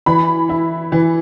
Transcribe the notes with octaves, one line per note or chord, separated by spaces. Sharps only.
E3 B5
E4
E3